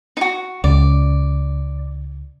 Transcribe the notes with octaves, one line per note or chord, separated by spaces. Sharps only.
D#4 F#4
C#2 D5